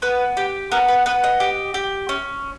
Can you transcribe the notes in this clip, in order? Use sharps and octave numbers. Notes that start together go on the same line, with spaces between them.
B3 B4
G4
B3 A#4
B4
B3 B4
D#5
G4
G4
C#4